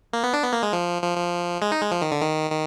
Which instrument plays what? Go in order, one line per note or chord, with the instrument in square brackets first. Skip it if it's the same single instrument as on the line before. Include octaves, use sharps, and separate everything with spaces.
[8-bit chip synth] A#3
B3
D4
B3
A#3
G#3
F3
F3
F3
G#3
D#4
G#3
F3
D#3
D3
D#3
D#3